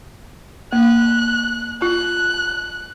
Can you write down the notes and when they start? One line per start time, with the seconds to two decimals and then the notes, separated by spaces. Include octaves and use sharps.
0.73 A#3 F#6
1.82 F4 F#6